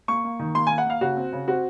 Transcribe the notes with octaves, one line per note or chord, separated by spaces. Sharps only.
A#3 C#6
A#3
D#3
A#3 C6
A#3 G#5
F#5
A#3 F5
C#3 F#4
C4
C#3
C4 F#4